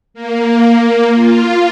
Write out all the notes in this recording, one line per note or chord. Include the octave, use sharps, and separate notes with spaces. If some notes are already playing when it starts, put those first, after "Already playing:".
A#3
F4